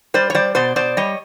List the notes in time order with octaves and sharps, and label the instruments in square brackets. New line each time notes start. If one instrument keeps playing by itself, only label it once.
[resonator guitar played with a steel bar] G3 C5 D5
C#5
G3 C5 D5
B2 C5 D5
B2 C5 D5
G3 C#5 D#5